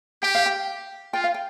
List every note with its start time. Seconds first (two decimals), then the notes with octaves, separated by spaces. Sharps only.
0.22 G4 G5
0.35 F5
0.46 G5
1.13 F4 G5
1.24 F5
1.34 G5